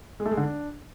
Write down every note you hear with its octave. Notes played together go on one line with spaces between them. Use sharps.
G#3
A3
G#3
D3
D4